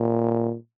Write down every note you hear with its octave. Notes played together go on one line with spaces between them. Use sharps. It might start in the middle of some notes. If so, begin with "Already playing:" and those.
Already playing: A#2